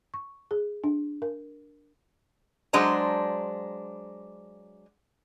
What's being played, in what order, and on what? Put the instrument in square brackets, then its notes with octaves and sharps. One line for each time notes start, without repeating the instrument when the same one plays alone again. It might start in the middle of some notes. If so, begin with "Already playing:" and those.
[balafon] C#6
G#4
D4
A#4
[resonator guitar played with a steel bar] F#3 G#3 D4 C5 A#5